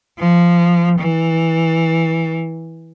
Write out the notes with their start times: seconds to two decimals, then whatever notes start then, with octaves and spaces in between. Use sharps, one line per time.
0.19 F3
0.99 E3